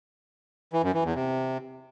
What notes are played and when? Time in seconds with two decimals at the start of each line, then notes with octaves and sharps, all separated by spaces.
0.73 E3
0.83 F#2
0.94 E3
1.04 E2
1.15 C3